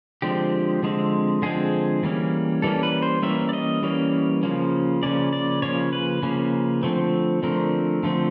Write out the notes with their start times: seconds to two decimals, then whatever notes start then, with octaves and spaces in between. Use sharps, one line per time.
0.22 D3 F3 G#3 C4 G4
0.83 D3 F3 G#3 C4
1.42 D3 F3 G#3 C4 G#4
2.03 E3 G3 A#3 C#4
2.62 E3 G3 A#3 C#4 A4
2.83 B4
3.02 C5
3.22 E3 G3 A#3 C#4 E5
3.49 D5
3.53 D#5
3.83 E3 G3 A#3 C#4
4.43 C#3 F3 A#3 C#4
5.03 C#3 F3 A#3 C#4 D5
5.33 D5
5.62 C#3 F3 A#3 C#4 C#5
5.93 B4
6.23 C#3 F3 A#3 C#4
6.83 D3 F3 A3 C4
7.43 D3 F3 A3 C4 A#4
8.03 D3 F3 A3 C4